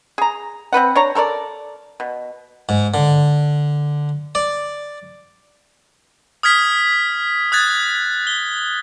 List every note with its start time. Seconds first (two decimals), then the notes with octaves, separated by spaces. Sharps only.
0.18 G#4 A#5
0.73 C4 D4 B4 F#5
0.95 D4 C#5 A#5
1.15 A4 A#4 C5 D5
2.00 B2
2.69 G#2
2.94 D3
4.35 D5
6.43 D#6 F6 G#6 B6
7.52 D#6 F#6 G#6 A6
8.27 G7